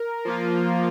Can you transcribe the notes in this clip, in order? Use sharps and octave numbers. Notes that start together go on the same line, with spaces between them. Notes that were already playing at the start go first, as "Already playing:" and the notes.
Already playing: A#4
F3 A#3 F4